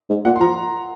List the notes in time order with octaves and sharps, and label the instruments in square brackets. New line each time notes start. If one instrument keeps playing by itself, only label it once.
[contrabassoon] G#2
[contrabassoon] A#2 [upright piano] F#5
[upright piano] C6
[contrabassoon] F3 [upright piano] A#5